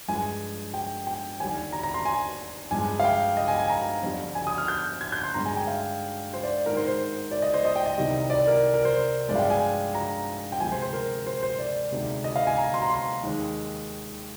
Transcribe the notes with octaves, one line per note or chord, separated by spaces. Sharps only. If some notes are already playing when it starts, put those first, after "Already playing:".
G2 F3 G#3 G#5
G5
G5
D#2 D3 G3 G#5
A#5
A#5
C6
G#5
G2 F3 G#3 G#5
F5
G5
D#5
G#5
G#5
A#5
F2 D3 G3
G#5
D#6
F6
G6
G#6
G6
C6
G2 D3 G#3 A#5
G#5
G5
F5
C5
D5
G#2 D#3 G#3 A#4
C5
C5
D5
D#5
C5
D#5
G5
D#5
C2 C3 D#3 G3
D5
A#4
A#4
C5
G2 F3 G#3 D5
F5
G5
G#5
A#5
G5
D2 C3 F3 G#3 G#5
C5
C5
A#4
C5
C5
D5
D2 C3 D#3 G#3
D#5
F5
G#5
A#5
C6
A#5
C6
D#2 D#3 G#3